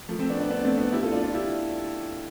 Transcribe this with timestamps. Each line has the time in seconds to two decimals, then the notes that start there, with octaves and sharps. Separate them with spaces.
0.09 F3 A3
0.19 A3 C4
0.29 B3 D4
0.40 B3 D4
0.50 B3 D4
0.64 A3 C4
0.78 B3 D4
0.92 E4 G4
1.02 F4 A4
1.13 D4 F4
1.24 D4 F4
1.34 E4 G4